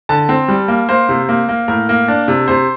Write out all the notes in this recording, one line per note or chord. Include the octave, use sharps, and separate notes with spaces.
D3 A5
C4
G3
A#3
A#3 C5
C3
A#3
A#3
A2 A#4
A#3
D4
C3
C3 C5